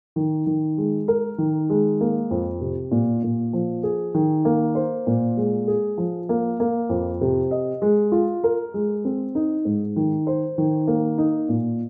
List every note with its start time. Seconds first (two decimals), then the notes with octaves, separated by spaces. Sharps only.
0.16 D#3
0.46 D#3
0.78 G#3
1.08 A#4
1.38 D#3
1.70 G#3
2.01 A#3
2.31 F2
2.61 C3
2.91 A#2
3.23 A#2
3.53 F3
3.83 G#4
4.14 D#3
4.45 A#3
4.75 C5
5.07 A#2
5.37 G#3
5.67 G#4
5.98 F3
6.29 A#3
6.60 A#3
6.89 F2
7.21 C3
7.51 D#5
7.82 G#3
8.12 F4
8.44 A#4
8.74 G#3
9.05 C4
9.35 D#4
9.65 G#2
9.96 D#3
10.27 C5
10.58 D#3
10.87 A#3
11.18 D#4
11.49 A#2